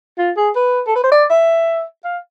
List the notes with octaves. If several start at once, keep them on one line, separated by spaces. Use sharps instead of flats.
F4
G#4
B4
A4
B4
C5
D5
E5
F5